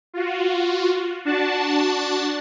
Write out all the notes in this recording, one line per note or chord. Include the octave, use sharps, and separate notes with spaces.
F4 F#4
D4 F#4 A5